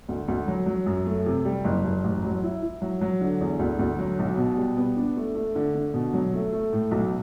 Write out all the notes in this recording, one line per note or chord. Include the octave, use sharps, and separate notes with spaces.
D2
D2
F#3
F#3
F#2
A3
C3
G3
F#1
F#1
A1
F#3
E4
E4
F#3
F#3
D3
E2
D2
D2
F#3
B1
B2
G3
B3
D4
A3
A3
D3
D3
B2
F#3
A3
A3
A2
B1